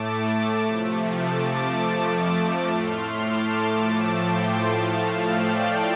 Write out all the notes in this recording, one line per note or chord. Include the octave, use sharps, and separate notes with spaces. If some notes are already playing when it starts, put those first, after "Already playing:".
Already playing: A2 A3 A5 D6
C3 F3 A3
A5 D6
F2 F3 A3
A2 A3 C6 F6
A5 D6
A2 F3 A3
G5 C6
A2 F3 A3 F5 A5
D5 G5